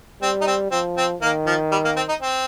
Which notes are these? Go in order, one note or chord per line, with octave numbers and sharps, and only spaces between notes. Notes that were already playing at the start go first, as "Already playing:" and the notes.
G3 C4
D#4
C4
F3 C4
C4
D#3 A#3
F3
G3
A#3
C4
D#4
C4